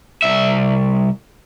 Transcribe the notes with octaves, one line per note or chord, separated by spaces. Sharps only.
C2 E5